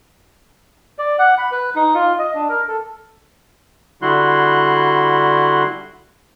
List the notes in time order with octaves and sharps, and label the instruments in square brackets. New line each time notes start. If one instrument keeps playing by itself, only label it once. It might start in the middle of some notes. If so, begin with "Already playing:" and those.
[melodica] D5
F#5
B5
B4
D#4
F4
D#5
D4
A#4
A4
[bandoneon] D3 G3 E4 F#4 C6 F#6